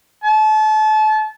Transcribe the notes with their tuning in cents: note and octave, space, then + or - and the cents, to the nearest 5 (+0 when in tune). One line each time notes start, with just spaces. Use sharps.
A5 -30